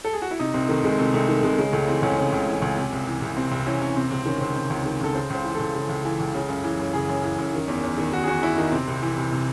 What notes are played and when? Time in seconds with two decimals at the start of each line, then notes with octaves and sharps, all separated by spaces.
0.05 A4
0.13 G#4
0.22 F#4
0.31 E4
0.39 C3 D#4
0.54 C2 C4
0.69 D#3 A3
0.84 C2 G#3
0.99 C3 A3
1.14 C2 A3
1.29 D#3
1.43 C2 G#3
1.58 C#3 G#3
1.73 C#2 A3
1.88 E3 C4
2.03 C#2 C#4
2.17 C#3 C#4
2.33 C#2
2.48 E3
2.62 C#2
2.77 C3
2.92 C2
3.07 E3
3.22 C2
3.37 C3 C4
3.51 C2 C4
3.66 E3 C#4
3.81 C2 C#4
3.96 C3 C4
4.11 C#2 C4
4.26 D#3 C#4
4.41 C#2 C5
4.56 C3
4.70 C#2
4.86 D#3
5.01 C#2 A4
5.15 C#3 C5
5.30 C#2 C5
5.44 E3
5.55 C#2 A4
5.75 C#3
5.89 C#2
6.05 E3
6.20 C#2
6.34 C#3
6.49 F#2
6.64 E3
6.79 F#2
6.93 C#3 G#4
7.09 F#2
7.24 E3
7.38 F#2
7.53 D#3
7.68 E2
7.83 E2
7.98 D#3
8.13 D#3 F#4
8.23 G#4
8.28 E2 F#4
8.42 E2 E4
8.57 D#3 D#4
8.72 C3 C4
8.87 C2
9.03 E3
9.17 C2
9.32 C3